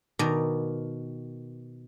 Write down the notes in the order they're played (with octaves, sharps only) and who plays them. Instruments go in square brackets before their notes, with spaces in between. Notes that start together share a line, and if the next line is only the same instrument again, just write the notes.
[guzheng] B2 D#3 D5 A#5